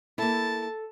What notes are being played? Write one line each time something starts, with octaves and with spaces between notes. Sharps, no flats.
A#3 E4 A4 A5